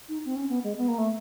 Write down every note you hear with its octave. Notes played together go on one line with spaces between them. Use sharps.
D#4
C4
C#4
B3
G#3
B3
A#3
A3